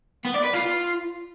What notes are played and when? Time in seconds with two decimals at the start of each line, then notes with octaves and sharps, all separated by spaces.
0.25 B3
0.34 D5
0.44 B4
0.53 F4